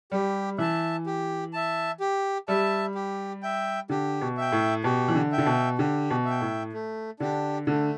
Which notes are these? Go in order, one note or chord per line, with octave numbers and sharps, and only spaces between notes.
G3 G4
E3 E5 A5
G4
E5 A5
G4
G3 E5 A5
G4
E5 G5
D3 G4
B2
E5 G5
A2
B2 G4
E3
D3
E5 G5
D3
B2
D3 G4
B2
E5 G5
A2
A3
D3 D4 G4
D3 A3